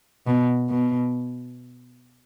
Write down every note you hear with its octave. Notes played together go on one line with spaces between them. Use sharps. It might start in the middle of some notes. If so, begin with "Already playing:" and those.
B2
B2